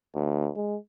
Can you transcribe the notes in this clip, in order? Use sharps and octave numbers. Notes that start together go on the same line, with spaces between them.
D2
G#3